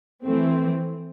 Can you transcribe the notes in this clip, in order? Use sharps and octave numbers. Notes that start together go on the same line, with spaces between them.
E3 A3 C4